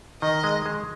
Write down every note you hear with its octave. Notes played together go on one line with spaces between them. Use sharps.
D#3 D#5
G#3
G#3